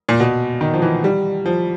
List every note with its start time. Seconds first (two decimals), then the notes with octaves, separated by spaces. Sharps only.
0.09 A#2
0.20 B2
0.61 D#3
0.74 F3
0.82 E3
1.04 G3
1.46 F3